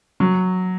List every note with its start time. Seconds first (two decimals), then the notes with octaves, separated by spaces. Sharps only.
0.20 F#3